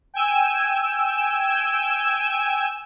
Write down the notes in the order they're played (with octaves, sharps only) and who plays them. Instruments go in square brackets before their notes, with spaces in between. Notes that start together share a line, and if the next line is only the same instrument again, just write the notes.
[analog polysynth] G5 G#5 E6